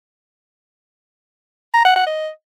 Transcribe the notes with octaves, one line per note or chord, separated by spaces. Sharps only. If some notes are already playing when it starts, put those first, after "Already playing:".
A#5
F#5
F#5
D#5